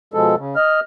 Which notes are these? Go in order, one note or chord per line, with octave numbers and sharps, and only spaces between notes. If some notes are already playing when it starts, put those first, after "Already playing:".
B2 F3 G#3 A4
C#3
D#5 F6